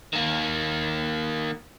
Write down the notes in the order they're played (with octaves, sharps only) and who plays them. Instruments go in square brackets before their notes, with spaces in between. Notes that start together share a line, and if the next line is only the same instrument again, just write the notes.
[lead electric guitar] D#3 A#3